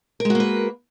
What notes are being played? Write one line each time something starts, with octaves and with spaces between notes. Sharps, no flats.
G#3 A#3 F#4 A#4 B4